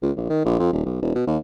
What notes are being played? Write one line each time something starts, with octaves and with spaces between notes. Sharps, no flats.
C#2
A#1
D#3
A#1
F2
D#1
B1
E1
B2
D#2